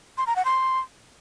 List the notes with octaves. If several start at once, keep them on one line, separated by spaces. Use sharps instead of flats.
C6
A#5
F#5
C6